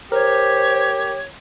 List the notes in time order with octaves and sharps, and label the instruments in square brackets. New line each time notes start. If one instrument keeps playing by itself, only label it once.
[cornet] G4 [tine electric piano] A#4 [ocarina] C5 [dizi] C#5